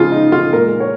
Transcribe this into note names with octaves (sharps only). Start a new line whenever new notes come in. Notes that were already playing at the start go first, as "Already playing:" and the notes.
Already playing: C#3 F3 G#3 F4 G#4
D#4
F4
A#2 G#3 A#4
C#5